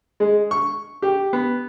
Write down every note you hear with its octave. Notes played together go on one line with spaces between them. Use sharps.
G#3
C#6
G4
B3